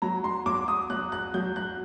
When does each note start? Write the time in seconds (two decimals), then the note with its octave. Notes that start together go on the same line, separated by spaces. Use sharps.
0.02 F#3 A#5
0.24 C6
0.46 F#3 D6
0.68 D#6
0.90 F#3 F#6
1.12 F#6
1.34 F#3 G6
1.56 F#6